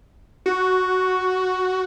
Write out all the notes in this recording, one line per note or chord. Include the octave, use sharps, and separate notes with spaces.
F#4